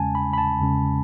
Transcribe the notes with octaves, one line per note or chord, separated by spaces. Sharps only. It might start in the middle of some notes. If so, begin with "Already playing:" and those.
Already playing: E2 C#3 G#3 C#4 G#5 A5
B5
B5
A5
E2 C#3 G#3 C#4